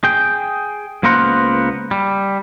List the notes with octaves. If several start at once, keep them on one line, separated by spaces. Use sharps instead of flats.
G#4 G5
C#2 A#3 B3 A#4 C5 F#5
G3